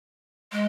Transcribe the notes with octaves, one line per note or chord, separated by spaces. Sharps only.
G#3